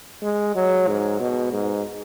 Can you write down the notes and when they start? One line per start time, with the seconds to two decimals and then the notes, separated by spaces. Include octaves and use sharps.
0.22 G#3
0.55 F#3
0.87 G#2
1.20 B2
1.53 G#2